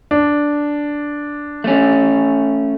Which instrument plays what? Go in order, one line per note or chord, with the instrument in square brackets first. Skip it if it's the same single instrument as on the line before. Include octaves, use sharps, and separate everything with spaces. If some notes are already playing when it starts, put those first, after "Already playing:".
[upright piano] D4
[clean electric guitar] A3 C#4